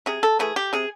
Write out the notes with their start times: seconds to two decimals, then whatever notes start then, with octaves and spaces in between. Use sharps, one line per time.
0.06 C3 G#4
0.23 A4
0.39 E3 A3 G#4
0.56 G4
0.73 C3 G#4